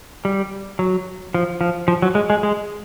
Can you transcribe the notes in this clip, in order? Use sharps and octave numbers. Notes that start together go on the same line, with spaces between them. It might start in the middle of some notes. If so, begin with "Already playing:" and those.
G3
F#3
F3
F3
F3
F#3
G#3
G#3
G#3